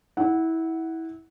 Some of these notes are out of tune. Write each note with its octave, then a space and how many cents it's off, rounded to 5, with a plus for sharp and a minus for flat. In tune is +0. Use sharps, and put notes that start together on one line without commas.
E4 -20 F#5 +0